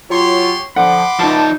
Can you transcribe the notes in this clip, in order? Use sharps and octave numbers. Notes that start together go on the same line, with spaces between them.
F#3 F4 G4 C#5 C6
D3 F3 F#5 B5 C6 D6
C#2 F3 D#4 A5